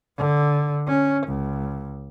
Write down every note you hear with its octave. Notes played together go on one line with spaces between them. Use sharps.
D3
C#4
C#2